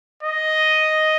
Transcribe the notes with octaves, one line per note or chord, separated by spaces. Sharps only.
D#5